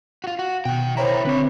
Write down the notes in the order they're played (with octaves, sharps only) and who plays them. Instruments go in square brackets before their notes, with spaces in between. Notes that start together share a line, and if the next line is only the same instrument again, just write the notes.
[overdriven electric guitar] F4 F#4
F#4
[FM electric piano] B2 [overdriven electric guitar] D#3 G5
[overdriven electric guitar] E4 A#4 [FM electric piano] C5 C#5 A#5
[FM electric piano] D3 C4 B5 [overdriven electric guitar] B4 C#5